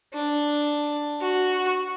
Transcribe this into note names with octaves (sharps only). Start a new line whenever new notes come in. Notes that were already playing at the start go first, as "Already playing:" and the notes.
D4
F#4